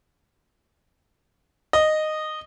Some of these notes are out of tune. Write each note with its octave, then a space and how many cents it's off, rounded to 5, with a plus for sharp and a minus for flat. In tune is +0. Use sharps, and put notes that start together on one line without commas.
D#5 -10